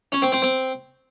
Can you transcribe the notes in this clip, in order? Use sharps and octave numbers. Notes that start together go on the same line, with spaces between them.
C#4
C4
C4
C4